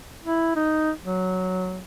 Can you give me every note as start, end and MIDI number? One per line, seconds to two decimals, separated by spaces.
0.24 0.54 64
0.56 0.91 63
1.05 1.82 54